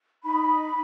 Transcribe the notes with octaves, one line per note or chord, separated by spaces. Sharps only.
D#4 B5